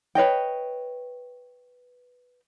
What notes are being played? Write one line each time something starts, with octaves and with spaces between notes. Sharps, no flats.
B4 C#5 D#5 G5